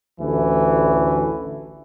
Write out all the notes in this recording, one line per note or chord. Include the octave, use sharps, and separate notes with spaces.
A1 D2 E3 A3